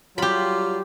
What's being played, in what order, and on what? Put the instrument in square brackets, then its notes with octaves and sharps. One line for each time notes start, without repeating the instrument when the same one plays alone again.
[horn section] F#3 G3 F4 [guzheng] G4 B5